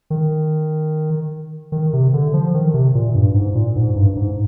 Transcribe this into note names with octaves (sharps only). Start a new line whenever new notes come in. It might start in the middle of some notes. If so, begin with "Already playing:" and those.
D#3
D#3
C3
D3
F3
D#3
C3
A#2
G2
G#2
A#2
G#2
G2
G#2